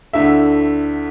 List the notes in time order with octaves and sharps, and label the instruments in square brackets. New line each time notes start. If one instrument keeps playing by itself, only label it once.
[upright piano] D2 D3 A3 E4 [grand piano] E5